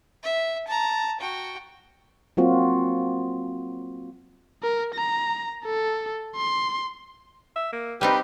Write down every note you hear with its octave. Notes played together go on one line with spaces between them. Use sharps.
E5
A5 A#5
F#4 G5
F#3 A#3 C4 F4 F#4
A#4
A#5
A4
C6
E5
A#3
G3 C4 D#4 G4 B4 B5